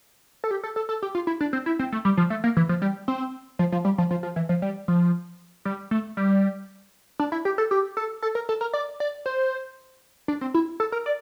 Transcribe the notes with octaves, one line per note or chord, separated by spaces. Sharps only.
A4
G4
A4
A4
A4
G4
F4
E4
D4
C4
E4
C4
A3
G3
F3
A3
A#3
E3
F3
G3
C4
F3
F3
G3
F3
F3
F3
E3
F3
G3
F3
G3
A3
G3
D4
E4
G4
A4
G4
A4
A4
A#4
A4
A#4
D5
D5
C5
D4
C4
E4
A4
A#4
D5